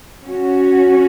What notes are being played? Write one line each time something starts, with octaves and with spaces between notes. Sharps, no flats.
C#4 F#4